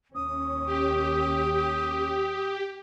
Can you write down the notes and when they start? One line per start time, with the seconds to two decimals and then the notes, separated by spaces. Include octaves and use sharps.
0.15 D#2 C#4 D#6
0.66 G4